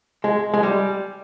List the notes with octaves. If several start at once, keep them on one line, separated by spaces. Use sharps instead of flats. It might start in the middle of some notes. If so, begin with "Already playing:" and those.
G#3
G#3
G3